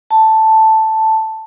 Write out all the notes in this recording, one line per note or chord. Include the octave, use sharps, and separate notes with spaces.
A5